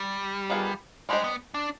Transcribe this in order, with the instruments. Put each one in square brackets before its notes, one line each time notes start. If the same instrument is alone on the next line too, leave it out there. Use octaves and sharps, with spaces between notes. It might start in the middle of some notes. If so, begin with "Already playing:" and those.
Already playing: [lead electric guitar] G3
[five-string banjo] D#3 B3 F4 G#4
[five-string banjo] G3 D4 G4 C5 D#5 [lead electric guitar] G#3
[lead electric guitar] B3
D4